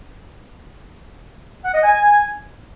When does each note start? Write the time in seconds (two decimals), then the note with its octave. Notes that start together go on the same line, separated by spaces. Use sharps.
1.64 F#5
1.74 D#5
1.83 G#5